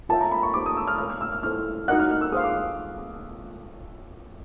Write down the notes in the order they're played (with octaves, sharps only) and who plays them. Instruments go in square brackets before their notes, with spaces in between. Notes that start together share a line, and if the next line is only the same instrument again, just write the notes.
[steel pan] F4 A#4 C#5 E5 G5 [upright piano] A5
[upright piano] A#5
B5
C#6
[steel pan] D#4 G4 C5 [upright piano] D6
[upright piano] D#6
E6
F6
[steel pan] A#4 C#5 F5 G#5 [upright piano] F6
[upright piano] F6
E6
F6
[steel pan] E4 A4 C5 [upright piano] F6
[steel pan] D#4 F#4 A#4 D#5 F#5 [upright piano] F#6
[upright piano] F6
F6
E6
[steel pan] G#4 C5 F5 [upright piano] D#6
[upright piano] D6